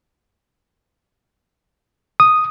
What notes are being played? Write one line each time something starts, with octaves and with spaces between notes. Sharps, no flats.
D#6